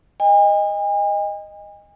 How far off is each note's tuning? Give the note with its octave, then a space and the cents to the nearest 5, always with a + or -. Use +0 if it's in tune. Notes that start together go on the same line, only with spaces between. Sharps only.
D#5 +0 G#5 -45